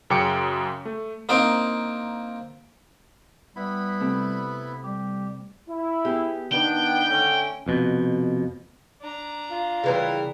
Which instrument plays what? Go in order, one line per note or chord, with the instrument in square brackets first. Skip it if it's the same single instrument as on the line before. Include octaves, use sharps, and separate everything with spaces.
[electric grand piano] F#2 C#3 G5 D6 C#7
A3
[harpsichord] A#3 C4 D4 D#4 F5 G5
[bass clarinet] G3 [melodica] B3 E4 B5
[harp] C3 A3
[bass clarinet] G3 [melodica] G4
[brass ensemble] E4
[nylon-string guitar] B3 G4 G#4
[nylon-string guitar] D#3 [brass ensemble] B3 D4 [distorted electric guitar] G5
[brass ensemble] D3 A3 C#4
[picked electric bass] F1 F2 B2
[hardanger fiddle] D4 A#5
[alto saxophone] F4
[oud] C#3 E3 G3 [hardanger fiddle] A#4